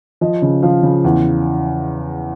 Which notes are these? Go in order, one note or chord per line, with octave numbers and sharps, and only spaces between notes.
F3 D#5
C#3
F3 F5
C#3
E2